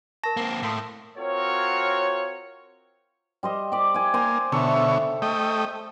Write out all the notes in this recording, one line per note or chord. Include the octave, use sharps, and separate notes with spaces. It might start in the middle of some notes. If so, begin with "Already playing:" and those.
A#4 A5 C#6 A#6
A#3 C4
A2 F5 C6 D#6
C4 F4 F#4 A#4 C#5
G3 C5 D#5
G4 D5
D5 G#5
A#3 C5 G#5
B2 D3 A4 C#5 E5
A3 D#5 G5